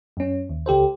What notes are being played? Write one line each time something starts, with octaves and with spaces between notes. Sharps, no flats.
F#2 C#4
D#2
C#2 G4 A4 C5